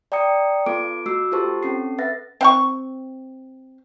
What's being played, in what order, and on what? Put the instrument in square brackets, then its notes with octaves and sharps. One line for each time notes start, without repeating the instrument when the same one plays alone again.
[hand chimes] D5 G5 A#5 D#6 C#7
B3 F4 A4 D6 D7
A3 F#4 D6 E6 C7
F4 G4 A4 C5 A5 C#6
C4 C#4 A4 C7
B4 E5 F#5 A6 A#6
[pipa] C4 F#5 C#6